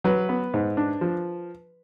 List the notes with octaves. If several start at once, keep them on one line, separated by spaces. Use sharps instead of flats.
F#3 B4
B3
G#2
D4
F3